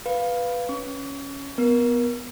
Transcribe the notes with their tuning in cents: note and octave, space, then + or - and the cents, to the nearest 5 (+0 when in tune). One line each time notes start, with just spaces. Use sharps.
B4 +0 F5 +0
C#4 +0 C#6 +35
B3 +0 A#4 +25